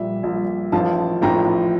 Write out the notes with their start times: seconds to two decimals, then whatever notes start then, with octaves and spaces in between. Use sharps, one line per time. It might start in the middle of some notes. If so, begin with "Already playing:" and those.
Already playing: A#1 A#2 G3 E5
0.23 A#1 A#2 G3
0.72 A1 A2 F3 F5 A5
1.22 A1 A2 F3 G5 A#5